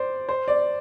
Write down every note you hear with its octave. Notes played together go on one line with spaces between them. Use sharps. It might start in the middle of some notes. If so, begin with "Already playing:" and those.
Already playing: C5 D5
C5
D5